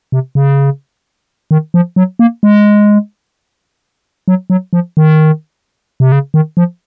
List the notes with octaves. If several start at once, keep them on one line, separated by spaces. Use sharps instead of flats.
C3
C#3
D#3
F3
F#3
A#3
G#3
F#3
F#3
F3
D#3
C3
C#3
D#3
F3